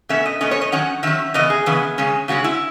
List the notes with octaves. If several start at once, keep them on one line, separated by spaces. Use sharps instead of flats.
B2 A3 C#4 E5
D#5
B2 A3 C#4 D#5
C#5
D#5
D#3 F#3 C#4 F#5
D#3 F#3 C#4 E5
C#3 E3 B3 D#5
G#4
C#3 E3 B3
C#3 G#3 C#4
C#3 G#3 C#4 F#4
E4